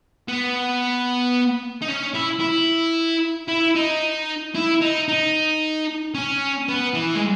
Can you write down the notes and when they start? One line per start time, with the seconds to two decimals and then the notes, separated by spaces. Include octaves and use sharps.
0.28 B3
1.82 D#4
1.88 C#4
2.14 E4
2.40 E4
3.48 E4
3.75 D#4
4.55 E4
4.81 D#4
5.08 D#4
6.14 C#4
6.68 B3
6.94 E3
7.16 G#3